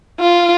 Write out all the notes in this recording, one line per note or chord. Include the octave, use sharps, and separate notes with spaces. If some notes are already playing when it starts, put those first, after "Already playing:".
F4